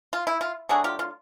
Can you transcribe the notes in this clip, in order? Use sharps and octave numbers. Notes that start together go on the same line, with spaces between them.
F4
E4
F4
F#3 A3 D4 F#4 G#4
F4 G4
F4